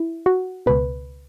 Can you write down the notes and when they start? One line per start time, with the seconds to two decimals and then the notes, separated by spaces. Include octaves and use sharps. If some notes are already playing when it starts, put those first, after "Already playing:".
Already playing: E4
0.26 F#4
0.66 C#2 B2 B4